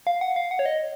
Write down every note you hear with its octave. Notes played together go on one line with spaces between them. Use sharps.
F5
F#5
F5
F#5
C#5
D#5